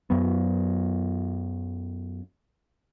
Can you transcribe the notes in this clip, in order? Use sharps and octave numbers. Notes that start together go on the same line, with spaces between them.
F#2 F#3 B3